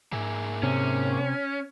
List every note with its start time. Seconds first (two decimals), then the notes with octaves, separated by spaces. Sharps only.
0.12 G#2 A#3 G#4 E5
0.63 C3 C#4